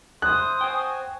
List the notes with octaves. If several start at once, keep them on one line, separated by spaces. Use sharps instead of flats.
E4 C5 D#6 F#6
F#4 C5 G5 G#5